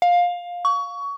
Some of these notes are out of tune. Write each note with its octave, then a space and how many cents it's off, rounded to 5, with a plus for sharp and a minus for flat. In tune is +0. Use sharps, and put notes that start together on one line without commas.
F5 +15
C#6 +25